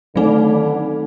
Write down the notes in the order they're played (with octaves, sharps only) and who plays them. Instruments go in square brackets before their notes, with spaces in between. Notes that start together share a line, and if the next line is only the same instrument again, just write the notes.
[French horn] D3 [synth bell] D#3 F#3 A3 C4 D#4